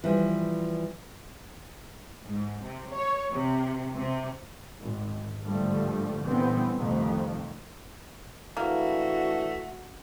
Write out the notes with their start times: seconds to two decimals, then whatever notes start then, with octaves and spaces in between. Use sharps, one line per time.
0.04 E3 F3 G3
2.26 G#2
2.63 C3
2.92 C#5
3.32 C3
3.96 C3
4.80 G#1
5.41 G#1 G2 D3 F3 G3 A3
6.25 A#2 D3 E3 G3 B3 C4
6.75 C2 F2 C3 D#3 F3 A3
8.57 E3 A3 A#3 D4 E4 F#4